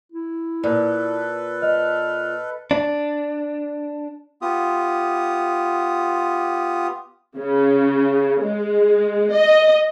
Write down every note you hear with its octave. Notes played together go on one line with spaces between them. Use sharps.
E4
A#2 A4 B4
D#5 F6
D4
B3 F4 G4 D#6
C#3
G#3
D#5